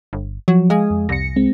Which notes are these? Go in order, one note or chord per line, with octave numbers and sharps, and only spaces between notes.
G1
F3 F#3
G#3 F5 G#5 D#6
F2
C2 A#6 C#7
G#3 C4